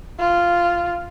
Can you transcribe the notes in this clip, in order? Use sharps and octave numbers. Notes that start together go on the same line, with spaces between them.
F4